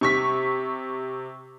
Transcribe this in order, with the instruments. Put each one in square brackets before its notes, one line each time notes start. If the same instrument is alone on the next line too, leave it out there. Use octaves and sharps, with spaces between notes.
[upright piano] C3 C#6 B6